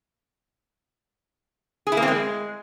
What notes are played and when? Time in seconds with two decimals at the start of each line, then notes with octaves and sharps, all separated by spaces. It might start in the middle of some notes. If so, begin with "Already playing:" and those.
1.87 G#4
1.92 E4
1.97 A#3
2.02 C4
2.08 G#3